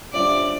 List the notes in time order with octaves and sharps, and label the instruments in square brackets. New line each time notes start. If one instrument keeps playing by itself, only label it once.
[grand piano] G3 D4 F4 C5 E5 [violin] D5